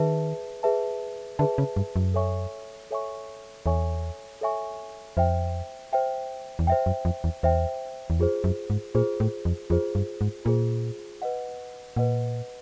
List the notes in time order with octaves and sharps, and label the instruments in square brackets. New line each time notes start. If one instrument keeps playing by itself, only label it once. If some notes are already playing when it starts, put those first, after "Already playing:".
Already playing: [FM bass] D#3 [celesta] G#4 B4 E5 A5
[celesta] G#4 B4 E5 A5
[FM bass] D3 [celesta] G#4 B4 E5 A5
[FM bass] C#3
G2
F#2
[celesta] A4 C#5 E5 G#5 C#6
A4 C#5 E5 G#5 C#6
[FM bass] E2 [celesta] A4 C#5 E5 G#5 C#6
[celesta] A4 C#5 E5 G#5 C#6
[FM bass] F2 [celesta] C5 E5 G5
[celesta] C5 E5 G5
[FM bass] E2
[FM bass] F2 [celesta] C5 E5 G5
[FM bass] F#2
F2
E2
[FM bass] E2 [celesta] C5 E5 G5
[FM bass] E2
[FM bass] F2 [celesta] F4 G#4 C5
[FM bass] F#2
G#2
[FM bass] A#2 [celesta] F4 G#4 C5
[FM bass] A2
F2
[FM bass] F2 [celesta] F4 G#4 C5
[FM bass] G2
G#2
[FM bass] A#2 [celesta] F4 G#4 C5
[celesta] B4 D#5 F#5
[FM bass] A#2 [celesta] B4 D#5 F#5